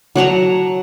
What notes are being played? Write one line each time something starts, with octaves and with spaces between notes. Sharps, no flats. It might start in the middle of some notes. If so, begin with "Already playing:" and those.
F#3 F#5 A5 A#5